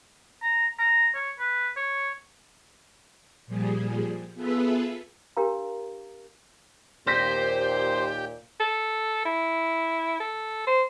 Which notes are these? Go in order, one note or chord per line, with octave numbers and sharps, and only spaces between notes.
A#5
A#5
C#5
B4
C#5
A#2 F3 G3 G#4
B3 F4 G#4 A4 B4 E5
D4 G4 A#4 F5 A#5
D#2 A#2 G4 C5 G6 A#6 B6
A4
E4
A4
C5